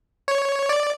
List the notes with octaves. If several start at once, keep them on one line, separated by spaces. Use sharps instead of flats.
C#5
D5